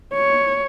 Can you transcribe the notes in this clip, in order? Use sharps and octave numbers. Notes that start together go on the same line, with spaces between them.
C#5